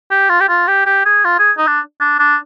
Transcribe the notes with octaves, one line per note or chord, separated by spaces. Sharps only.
G4
F4
G4
F4
G4
G4
G#4
F4
G#4
D#4
D4
D4
D4